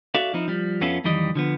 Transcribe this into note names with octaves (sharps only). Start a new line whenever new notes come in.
F#4 A4 D5 E5 F5
F3 C4 D#4 E4
F3 G3
F2 B3 C#4 E4 F4 A4
F2 D#3 E3 G3 D#5
D3 F3 B3